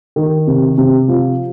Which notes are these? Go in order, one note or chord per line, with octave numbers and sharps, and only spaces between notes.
D#3
C3
C3
F3